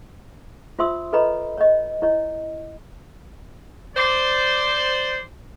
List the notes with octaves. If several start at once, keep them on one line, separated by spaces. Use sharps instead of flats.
F4 C5 E5 C6 D#6 E6
A4 B4 C#5 D#5 A#5 B5
C#5 D#5
E4 C#5 D#5
C5 D5